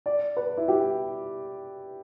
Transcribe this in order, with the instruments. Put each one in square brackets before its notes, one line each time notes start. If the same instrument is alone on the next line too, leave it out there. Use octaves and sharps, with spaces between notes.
[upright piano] D5
B4
E4
G4